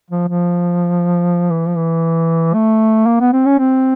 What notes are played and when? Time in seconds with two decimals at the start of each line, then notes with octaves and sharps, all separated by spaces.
0.11 F3
0.28 F3
1.50 E3
1.67 F3
1.76 E3
2.54 A3
3.06 A#3
3.20 B3
3.33 C4
3.46 C#4
3.59 C4